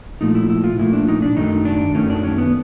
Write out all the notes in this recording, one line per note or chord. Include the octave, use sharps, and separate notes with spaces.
A#2 F3 A3 D#4
E4
E4
F4
A#2 F3 A3 E4
D4
D#4
D4
F#2 D#3 F#3 A3 D#4
D4
F#2 D#3 F#3 A3 C#4
D4
C#4
B3